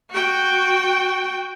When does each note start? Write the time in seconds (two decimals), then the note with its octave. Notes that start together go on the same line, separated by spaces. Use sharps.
0.10 F#4 G5